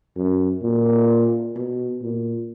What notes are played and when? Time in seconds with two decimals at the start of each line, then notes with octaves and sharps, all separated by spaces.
0.17 F#2
0.63 A#2
1.55 B2
2.02 A#2